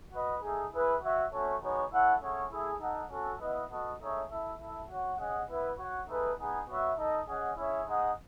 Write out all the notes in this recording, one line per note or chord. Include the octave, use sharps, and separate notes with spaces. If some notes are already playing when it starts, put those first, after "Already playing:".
F#4 B4 D#5
A3 D#4 G#4
E4 G#4 B4 E5
F#4 C#5 E5
A3 C#4 F#4 A4 C#5
G#3 B3 D#4 F#4 C#5
E4 A4 C#5 F#5
A3 C#4 G#4 C#5 F#5
A3 E4 G#4
D#4 A4 D#5 F#5
C#4 F#4 A4
B3 E4 B4 D#5
B3 F#4 A4 D#5 F#5
A3 D#4 G#4 C#5 E5
E4 A4 E5
E4 A4 E5
F#4 C#5 F#5
C#4 G#4 D#5 F#5
B3 E4 B4 E5
F#4 C#5 F#5
A3 D#4 G#4 B4
B3 D#4 G#4
B3 F#4 C#5 E5
D#4 A4 D#5
C#4 G#4 D#5 F#5
C#4 E4 G#4 C#5 E5
G#3 D#4 G#4 D#5 F#5